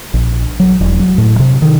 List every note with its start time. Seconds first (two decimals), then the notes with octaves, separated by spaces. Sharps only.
0.14 A#1
0.60 F#3
0.80 E1
0.99 F#3
1.18 A2
1.39 C3
1.62 D#3